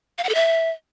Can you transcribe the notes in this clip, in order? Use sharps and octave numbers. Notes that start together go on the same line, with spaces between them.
F5
F#5
A4
E5